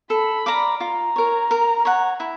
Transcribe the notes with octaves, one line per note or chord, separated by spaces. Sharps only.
A4 B5
D5 F5 A#5
F4 A#5
A#4 C#5
A#4
C#5 F#5
E4